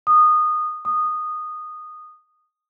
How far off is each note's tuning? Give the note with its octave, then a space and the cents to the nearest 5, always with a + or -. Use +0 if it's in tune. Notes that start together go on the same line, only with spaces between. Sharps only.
D#6 -20
D#6 -15